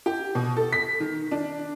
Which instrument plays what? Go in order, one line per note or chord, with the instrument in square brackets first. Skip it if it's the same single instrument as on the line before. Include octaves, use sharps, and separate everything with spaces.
[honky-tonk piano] G4
B2
A4
B6
D#3
D4